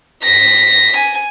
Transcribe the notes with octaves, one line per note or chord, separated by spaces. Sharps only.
A#6 B6
G#5